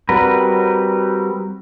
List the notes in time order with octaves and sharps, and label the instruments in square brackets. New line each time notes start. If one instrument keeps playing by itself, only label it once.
[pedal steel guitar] G3 C4 F#4 A#4 B4